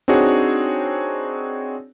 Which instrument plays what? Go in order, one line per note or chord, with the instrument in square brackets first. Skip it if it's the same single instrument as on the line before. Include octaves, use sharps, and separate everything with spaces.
[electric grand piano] C4 D4 D#4 F#4 G#4 C#5